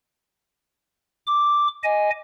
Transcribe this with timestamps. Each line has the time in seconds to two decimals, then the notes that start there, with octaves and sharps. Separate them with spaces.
1.27 D6
1.84 D#5 G#5